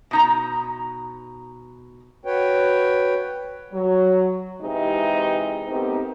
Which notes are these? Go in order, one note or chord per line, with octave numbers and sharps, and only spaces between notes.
B2 D#4 A#5
F#4 B4 C#5 G5
F#3
C3 E3 G#3 D#4 E4 G4
A3 B3 C4 D#4 G4 A#4